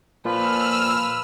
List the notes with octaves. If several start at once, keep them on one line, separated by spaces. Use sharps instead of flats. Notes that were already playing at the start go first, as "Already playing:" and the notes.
A#2 F3 F4 B4 E6 F6